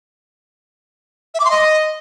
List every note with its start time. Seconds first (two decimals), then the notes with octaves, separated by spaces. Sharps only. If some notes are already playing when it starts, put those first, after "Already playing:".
1.34 E5
1.40 D6
1.45 C6
1.50 D#5